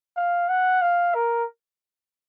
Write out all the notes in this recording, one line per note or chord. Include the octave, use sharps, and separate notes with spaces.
F5
F#5
F5
A#4